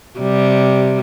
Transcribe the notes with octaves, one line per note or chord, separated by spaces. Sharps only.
C3 G3